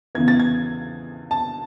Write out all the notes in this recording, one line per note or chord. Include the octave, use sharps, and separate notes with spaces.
E2 C#3 E3 B3 G#6
A6
G#6
A5